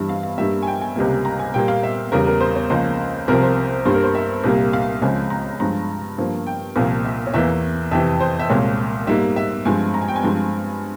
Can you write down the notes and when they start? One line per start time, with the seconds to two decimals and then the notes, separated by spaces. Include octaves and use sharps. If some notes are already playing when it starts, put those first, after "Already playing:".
Already playing: G2 E3 G3 E5
0.09 F5
0.23 F5
0.38 G2 G3 A#3 E5
0.63 G#5
0.67 G5
0.82 G#5
0.96 C#2 C3 G3 A#3
1.25 A#5
1.39 G#5
1.54 A#2 G3 A#3 G5
1.68 F5
1.83 E5
2.12 E2 C#3 G3 A#4
2.27 A#4
2.41 C5
2.56 C#5
2.70 C#2 C#3 F3 A#3 C5
3.28 C2 C3 F3 C4 A#4
3.42 C5
3.85 G2 G3 A#3 C5
3.94 A#4
4.03 C5
4.15 E5
4.44 C2 A#2 G3 A#3
4.73 F5
5.02 C#2 C#3 F3 G#3 C4 G#5
5.30 A#5
5.60 G2 F3 G#3 A#5
6.18 G2 F3 A#3
6.47 G5
6.76 C2 A#2 F3 A#3
7.05 E5
7.27 C#5
7.34 E2 E3 A#3 E5
7.91 F2 C3 E3 E5
8.20 C5
8.39 E5
8.50 C2 A#2 G#3 C#5
9.07 G#2 G3 A#3 E5
9.36 E5
9.65 G2 F3 G#3 C4 G#5
9.94 A#5
10.01 G#5
10.08 G5
10.16 G#5
10.23 G2 F3 G#3 C4